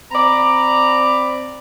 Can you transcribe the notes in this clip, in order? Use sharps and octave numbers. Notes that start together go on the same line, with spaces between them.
C4 D5 A#5 B5